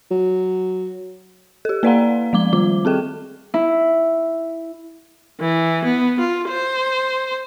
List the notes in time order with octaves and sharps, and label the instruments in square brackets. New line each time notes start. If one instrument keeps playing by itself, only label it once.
[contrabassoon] F#3
[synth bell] G4 A4
A#3 B4 D5 F5 F#5 A#5
F3 G#3 D6 G7
D#3 G3 F4 D6
C4 G#4 A4 G5
[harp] E4
[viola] E3
B3
F4
C5